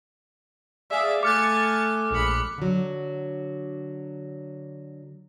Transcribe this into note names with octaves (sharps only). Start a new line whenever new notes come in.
G#4 D5 E5 F5
A3 G#5 D6 F6 F#6 A6 C#7
A#1 G#3 B5 C#7
D3 F#3